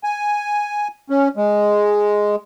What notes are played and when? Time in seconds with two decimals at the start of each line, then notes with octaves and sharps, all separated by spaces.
0.04 G#5
1.10 C#4
1.37 G#3